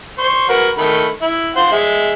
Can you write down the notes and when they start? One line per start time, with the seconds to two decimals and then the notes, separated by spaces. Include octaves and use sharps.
0.19 C5 C#6
0.49 F#4 A#4 B4
0.78 D#3 A3 B5
1.22 E4
1.56 F4 C5 F#5
1.72 G#3 E5